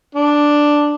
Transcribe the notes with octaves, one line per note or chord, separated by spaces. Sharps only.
D4